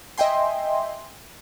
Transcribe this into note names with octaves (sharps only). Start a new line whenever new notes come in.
D#5 E5 G5 G#5 C6